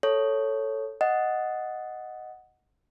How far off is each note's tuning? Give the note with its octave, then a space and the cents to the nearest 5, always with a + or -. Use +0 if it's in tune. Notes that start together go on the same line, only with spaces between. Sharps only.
A4 +0 C#5 +0
D#5 +0 F#5 +0